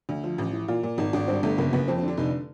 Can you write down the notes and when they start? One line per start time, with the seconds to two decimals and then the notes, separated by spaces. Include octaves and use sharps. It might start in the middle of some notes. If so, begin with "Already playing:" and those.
0.09 D2
0.24 F3
0.38 A1
0.53 E3
0.68 A#2 F4
0.83 A#2
0.98 G#1 D#4
1.13 G#1 D4
1.28 G2 C4
1.43 G1 A3
1.58 F#1 A#3
1.73 F#1 B3
1.88 F2 C4
1.98 C4
2.03 D3
2.08 D4
2.17 F1 D#4